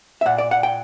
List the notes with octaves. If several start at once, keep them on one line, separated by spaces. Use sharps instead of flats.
E5
A#2 F#5
D5
F#5
G5